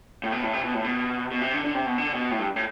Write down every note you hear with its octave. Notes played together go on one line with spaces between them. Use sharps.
A2
B2
A2
C3
B2
A2
B2
B2
C3
D3
D3
C3
B2
D3
B2
A2
G2
A2